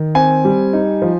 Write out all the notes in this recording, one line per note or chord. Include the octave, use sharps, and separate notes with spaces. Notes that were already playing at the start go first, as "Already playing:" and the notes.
Already playing: D#3
C4 G#5
G3
D#4
F3